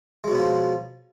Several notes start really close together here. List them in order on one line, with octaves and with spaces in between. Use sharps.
G#3 F#3 B2 B3 F3